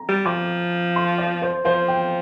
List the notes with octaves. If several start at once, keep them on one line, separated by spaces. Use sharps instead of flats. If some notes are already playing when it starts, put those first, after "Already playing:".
Already playing: A#5
G3
F3 D6
C6
D5
C5
F3 C5
G5